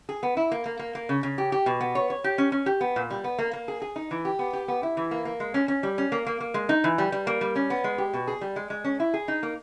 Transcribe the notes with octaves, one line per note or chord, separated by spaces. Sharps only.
G#4
B3
E4
A#3
A#3
A#3
A#3
C#3
C#3
G4
G4
B2
B3
C#5
C#5
G4
C#4
C#4
G4
B3
A#2
G3
B3
A#3
A#3
G#4
G#4
D#4
E3
G4
B3
G4
B3
E4
E3
A#3
A#3
G#3
C#4
C#4
G3
C#4
A#3
A#3
A#3
G#3
D#4
E3
G3
G3
A#3
G3
C#4
B3
G#3
G4
B2
G#4
G3
G#3
G#3
C#4
E4
G#4
D#4
A#3